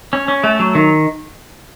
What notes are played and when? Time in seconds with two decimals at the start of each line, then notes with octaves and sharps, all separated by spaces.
0.13 C#4
0.28 C#4
0.44 A3
0.59 F#3
0.75 D#3